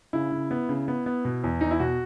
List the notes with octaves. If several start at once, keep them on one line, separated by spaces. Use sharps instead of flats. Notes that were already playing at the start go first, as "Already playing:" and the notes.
C#3 E4
C#3
B3
C#3
B3
B3
B2
E2
E2 D#4
E4
B2 F#4